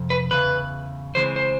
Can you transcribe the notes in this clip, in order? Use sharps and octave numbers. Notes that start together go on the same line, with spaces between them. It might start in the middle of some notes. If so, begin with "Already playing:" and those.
Already playing: F2 C3
B4
E2 C#3 B4
C#3 E3 G#3 C4 C5
C5